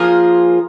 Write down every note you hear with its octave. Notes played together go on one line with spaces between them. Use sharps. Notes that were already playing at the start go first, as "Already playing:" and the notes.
Already playing: F3 A#3 F4 G#4